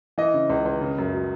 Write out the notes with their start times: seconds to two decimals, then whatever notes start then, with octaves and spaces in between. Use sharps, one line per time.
0.18 E3 D#5
0.34 C#3
0.50 C#2
0.66 C#2
0.81 C#3
0.98 F#2
1.14 F#3